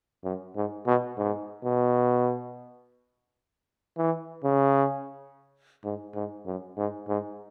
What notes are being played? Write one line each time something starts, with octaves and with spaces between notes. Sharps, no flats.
F#2
G#2
B2
G#2
B2
E3
C#3
G#2
G#2
F#2
G#2
G#2